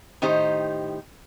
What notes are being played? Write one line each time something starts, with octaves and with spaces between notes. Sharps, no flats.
A2 D#3 D#4 G4 C5